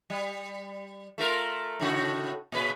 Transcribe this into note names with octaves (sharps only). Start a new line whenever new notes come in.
G3
A3 F4 A#4
A2 C#3 F#4
A#2 C#3 B4